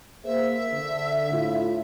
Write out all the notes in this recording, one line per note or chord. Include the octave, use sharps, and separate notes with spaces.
A#3 G#4 C5 E5
D3
A2 F4